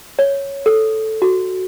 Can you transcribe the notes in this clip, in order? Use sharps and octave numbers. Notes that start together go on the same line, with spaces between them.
C#5
A4
F#4